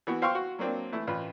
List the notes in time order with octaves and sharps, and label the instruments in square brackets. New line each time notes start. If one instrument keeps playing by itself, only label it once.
[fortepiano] E3 B3 F#4
C5 F5 G5 C6 C#6
F#4
F#3 A#3 C4 D4
E3 A3 E4
A1 F4 B4